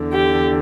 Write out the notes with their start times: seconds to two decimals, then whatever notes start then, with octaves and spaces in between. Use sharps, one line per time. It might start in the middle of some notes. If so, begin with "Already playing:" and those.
Already playing: E2 D3
0.13 G4